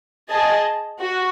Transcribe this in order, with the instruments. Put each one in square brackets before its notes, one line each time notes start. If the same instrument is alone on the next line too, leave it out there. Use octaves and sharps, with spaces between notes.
[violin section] G#4 D#5 A5
F#4